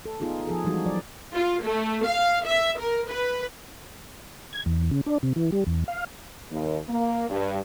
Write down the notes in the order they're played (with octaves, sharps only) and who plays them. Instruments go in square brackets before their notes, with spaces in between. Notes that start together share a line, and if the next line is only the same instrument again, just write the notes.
[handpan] A4
B3 D#4 F4 G#4 A4
F3 G#4 A4
E3 F3 G3 G#3 D#4 F#4
F#3 D5
[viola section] F4
A3
F5
E5
A#4
B4
[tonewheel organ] G#6
E2
C#3
D4
C3
E3
G3
E2
F5
[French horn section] D#2
A#3
G2